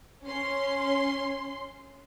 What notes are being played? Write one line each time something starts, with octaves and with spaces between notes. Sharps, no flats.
C#4 C6